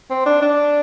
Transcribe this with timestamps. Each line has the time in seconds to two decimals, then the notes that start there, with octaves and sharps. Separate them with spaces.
0.10 C4
0.26 D4
0.42 D4